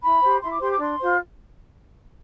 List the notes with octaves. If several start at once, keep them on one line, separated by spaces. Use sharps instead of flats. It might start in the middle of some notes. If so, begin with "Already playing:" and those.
E4 B5
G4 C5
E4 C6
D6
G4 C5 C6
D6
D4 C6
F4 C5